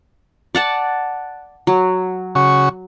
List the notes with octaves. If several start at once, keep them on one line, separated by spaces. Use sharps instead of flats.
D5 F#5 A5
F#3
C#3 F#4 C#6